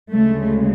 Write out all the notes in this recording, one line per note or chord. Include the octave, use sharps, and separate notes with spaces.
D2 C#3 G#3 A3